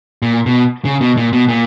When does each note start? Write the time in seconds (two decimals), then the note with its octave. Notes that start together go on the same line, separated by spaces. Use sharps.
0.22 A#2
0.46 B2
0.85 C#3
1.01 B2
1.17 A#2
1.33 B2
1.48 A#2